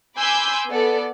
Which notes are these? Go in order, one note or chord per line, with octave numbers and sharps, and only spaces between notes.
G#5 B5 C6 D6 E6 G6
B3 A4 D5